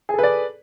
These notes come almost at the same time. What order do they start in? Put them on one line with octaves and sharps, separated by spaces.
G#4 A4 B4 D5